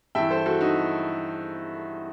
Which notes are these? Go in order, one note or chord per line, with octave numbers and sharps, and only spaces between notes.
G2 E3 E5 G5
A4 C5
F#4 A4
D#4 F#4